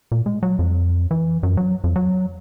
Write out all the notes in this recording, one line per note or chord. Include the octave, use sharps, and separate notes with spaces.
A#2
G#3
F#3
F2
E3
F#2
F#3
F2
F#3